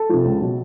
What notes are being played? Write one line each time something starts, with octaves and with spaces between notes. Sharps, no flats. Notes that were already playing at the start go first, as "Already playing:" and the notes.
Already playing: A4 A5
C3 F3
C#2
B2 F#3